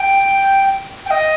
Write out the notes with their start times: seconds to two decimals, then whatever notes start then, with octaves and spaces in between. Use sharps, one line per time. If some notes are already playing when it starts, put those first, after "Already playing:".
Already playing: G5
1.06 G5
1.11 D#5